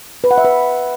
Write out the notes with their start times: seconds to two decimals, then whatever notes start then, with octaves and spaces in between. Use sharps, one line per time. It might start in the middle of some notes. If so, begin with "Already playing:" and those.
0.24 B4
0.31 F#5
0.38 E5
0.45 B4